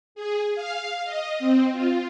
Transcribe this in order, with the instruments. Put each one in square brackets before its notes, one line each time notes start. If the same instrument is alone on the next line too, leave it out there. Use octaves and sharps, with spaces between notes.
[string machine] G#4
F5
D#5
C4
F4